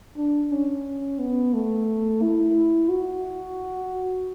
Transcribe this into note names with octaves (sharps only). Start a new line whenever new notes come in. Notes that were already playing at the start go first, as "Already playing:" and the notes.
D4
C#4
B3
A3
E4
F#4